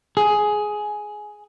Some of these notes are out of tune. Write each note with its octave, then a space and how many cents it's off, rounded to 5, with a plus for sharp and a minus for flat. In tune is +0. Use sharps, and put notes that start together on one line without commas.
G#4 +10